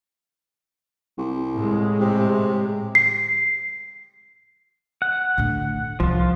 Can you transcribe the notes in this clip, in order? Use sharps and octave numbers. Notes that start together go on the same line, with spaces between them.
C2
A2 G#3
C3
C7
F#5
A2 D3
C2 F3 F4